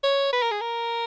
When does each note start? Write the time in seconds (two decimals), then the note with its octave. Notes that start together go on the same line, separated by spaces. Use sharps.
0.04 C#5
0.33 B4
0.42 A#4
0.51 G#4
0.61 A#4